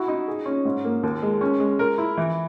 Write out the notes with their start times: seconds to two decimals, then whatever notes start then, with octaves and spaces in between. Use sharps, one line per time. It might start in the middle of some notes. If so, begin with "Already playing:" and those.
Already playing: E4 F#4
0.08 D#4
0.27 G#4
0.46 C#4
0.65 G#2
0.85 A#3
1.03 D#2
1.22 G#3
1.41 C#4
1.60 G#3
1.79 A#4
1.98 E4
2.17 E3